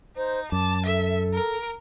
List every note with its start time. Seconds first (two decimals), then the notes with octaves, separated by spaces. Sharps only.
0.17 D#4 C5
0.52 F#2 A5 D6
0.86 A4 E5
1.33 A#4